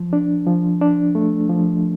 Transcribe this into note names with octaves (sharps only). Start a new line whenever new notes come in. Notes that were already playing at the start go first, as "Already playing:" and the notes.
Already playing: F3
D4
F3
D4
A3
F3